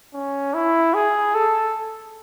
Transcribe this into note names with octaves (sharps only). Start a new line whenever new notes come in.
C#4
E4
G#4
A4